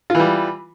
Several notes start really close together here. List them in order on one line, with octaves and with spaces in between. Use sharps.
F4 E3 G3